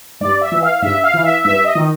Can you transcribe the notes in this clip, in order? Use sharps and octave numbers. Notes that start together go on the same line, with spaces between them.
G2 D5
E5
E3
F5
G2 E5
F5
E3
E5
G2 E5
D#5
D#3